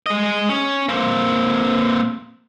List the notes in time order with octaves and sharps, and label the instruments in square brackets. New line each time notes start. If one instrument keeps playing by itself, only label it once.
[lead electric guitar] G#3 D#5
C#4
A#3 C4